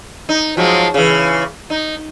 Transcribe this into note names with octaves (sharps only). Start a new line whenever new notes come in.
D#4
F3 F#3 G#3
C#3 E3
D#4